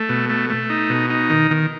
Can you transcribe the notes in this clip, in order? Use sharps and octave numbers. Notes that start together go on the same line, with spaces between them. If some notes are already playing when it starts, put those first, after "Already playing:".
Already playing: A3
B2
A3
A3
D#4
B2
D#4
D#3
D#3